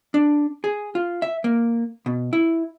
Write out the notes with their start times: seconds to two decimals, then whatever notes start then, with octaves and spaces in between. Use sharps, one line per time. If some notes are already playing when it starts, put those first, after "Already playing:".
0.14 D4
0.64 G#4
0.95 F4
1.22 E5
1.44 A#3
2.06 B2
2.33 E4